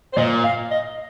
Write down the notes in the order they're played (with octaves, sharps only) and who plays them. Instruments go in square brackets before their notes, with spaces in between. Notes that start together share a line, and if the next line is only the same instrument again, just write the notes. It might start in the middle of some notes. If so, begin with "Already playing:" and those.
[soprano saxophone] C5
[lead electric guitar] A#2 [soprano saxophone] D#5
[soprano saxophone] F5
D#5